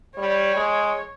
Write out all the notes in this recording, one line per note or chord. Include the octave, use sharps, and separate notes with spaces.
G3 C#5
G#3